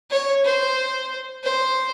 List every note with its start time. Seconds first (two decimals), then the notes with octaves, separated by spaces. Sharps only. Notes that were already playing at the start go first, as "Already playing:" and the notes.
0.11 C#5
0.45 C5
1.44 C5